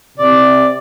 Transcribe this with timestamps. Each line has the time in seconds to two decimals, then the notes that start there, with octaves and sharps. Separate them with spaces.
0.18 C3 D5